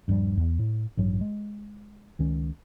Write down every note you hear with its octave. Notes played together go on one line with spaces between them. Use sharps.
D#1 G2 F3 G3
E2
A2
A1 G2 F#3
G#3
C#2 D#3 C#4